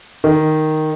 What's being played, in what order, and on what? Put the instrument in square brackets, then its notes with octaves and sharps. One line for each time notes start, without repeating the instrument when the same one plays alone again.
[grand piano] D#3